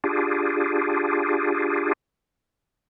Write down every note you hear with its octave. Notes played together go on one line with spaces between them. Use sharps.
D4 F4 G4 G#4